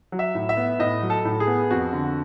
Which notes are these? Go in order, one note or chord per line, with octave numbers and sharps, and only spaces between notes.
F#3
E5
A2
E5
B3
A2 D#5
F#3
A4
A2
G#4
B3
F2 F#4
D3